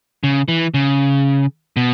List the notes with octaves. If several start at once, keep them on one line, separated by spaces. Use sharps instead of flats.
C#3
E3
C#3
B2